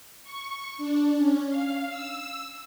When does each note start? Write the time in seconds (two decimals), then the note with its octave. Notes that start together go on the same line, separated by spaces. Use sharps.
0.23 C#6
0.78 D4
1.16 C#4
1.49 F5
1.88 E6